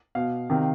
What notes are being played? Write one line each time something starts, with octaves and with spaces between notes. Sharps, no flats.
B2 F5
C3 D#3